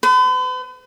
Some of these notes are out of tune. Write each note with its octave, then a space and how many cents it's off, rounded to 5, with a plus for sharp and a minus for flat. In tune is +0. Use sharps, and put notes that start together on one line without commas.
B4 +45